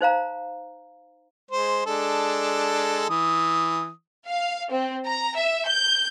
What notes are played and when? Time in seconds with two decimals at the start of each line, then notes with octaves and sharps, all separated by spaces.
0.01 D#4 C5 F5 A#5
1.51 G#3 C5
1.86 G#3 D4 A4
3.10 E3 D#6
4.27 F5
4.70 C4
5.05 A#5
5.36 E5
5.67 G6